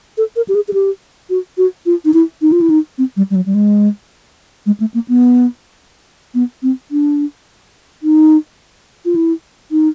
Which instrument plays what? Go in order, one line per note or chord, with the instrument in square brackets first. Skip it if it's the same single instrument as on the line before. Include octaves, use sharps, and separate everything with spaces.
[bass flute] A4
A#4
G4
G#4
G#4
G4
F#4
F#4
F4
D#4
E4
D#4
F4
E4
D#4
C4
G3
G3
F#3
G3
G#3
G#3
A3
A#3
B3
B3
C4
D4
D#4
F4
E4
D#4